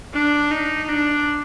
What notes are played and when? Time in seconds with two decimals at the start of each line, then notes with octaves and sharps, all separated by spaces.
0.14 D4
0.51 D#4
0.89 D4